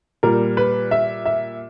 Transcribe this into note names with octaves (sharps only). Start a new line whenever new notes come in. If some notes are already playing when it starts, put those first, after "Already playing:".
A#2 G3 A#4
B4
E5
E5